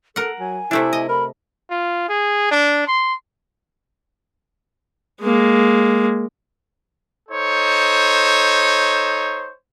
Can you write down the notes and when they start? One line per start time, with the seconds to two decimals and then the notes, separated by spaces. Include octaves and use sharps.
0.16 A4 A#4 F#5
0.39 F#3 G#5
0.71 C3 A3 D4 E4
0.93 D#5
1.08 A#4 B5
1.70 F4
2.09 G#4
2.51 D4
2.88 C6
5.22 G#3 A#3
7.29 D#4 A4 C5 C#5